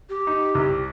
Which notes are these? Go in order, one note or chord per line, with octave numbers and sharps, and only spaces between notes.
G4
D#4
C2